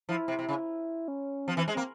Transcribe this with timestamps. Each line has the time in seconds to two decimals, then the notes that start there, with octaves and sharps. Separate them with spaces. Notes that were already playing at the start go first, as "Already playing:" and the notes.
0.09 F3 E4
0.28 C3
0.39 C3
0.49 C#3
1.08 C#4
1.47 F3 C4
1.57 E3
1.68 G#3
1.74 A#3 C4